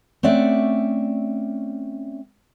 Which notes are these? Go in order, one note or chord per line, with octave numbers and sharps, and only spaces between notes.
A3 C4 C#4 D5 E5 F#5